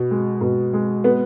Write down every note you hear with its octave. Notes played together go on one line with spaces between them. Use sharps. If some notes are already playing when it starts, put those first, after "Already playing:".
Already playing: B2
G#3
B2
G#3
B3